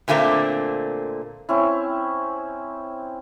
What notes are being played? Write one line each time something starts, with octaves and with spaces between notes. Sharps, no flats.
A#2 D3 A3 A#3 C4
C4 C#4 E4